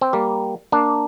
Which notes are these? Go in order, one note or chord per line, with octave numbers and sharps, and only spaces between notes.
C4
G3 A#3
A#3 D4